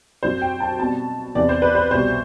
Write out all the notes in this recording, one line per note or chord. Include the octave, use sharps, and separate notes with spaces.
F#2 F#3 C4 C5
G5
A5
B2 G3 C4 A5
E2 C3 E3 D5
C5
B4
C5
C2 B2 G3 C5